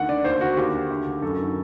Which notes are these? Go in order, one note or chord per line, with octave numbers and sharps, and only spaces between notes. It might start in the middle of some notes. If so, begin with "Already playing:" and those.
Already playing: D2 D#3 F#5
D3 D5
D#2 C5
D3 F#4
D#2 G4
D3
D2
D3
F#2 A4
D#3